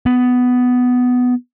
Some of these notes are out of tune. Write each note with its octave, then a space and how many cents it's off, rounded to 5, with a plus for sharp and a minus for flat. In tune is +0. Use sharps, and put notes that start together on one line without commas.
B3 +10